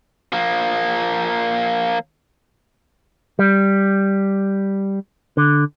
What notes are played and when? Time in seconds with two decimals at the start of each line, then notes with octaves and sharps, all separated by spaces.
0.33 F3 A#3
3.39 G3
5.37 D3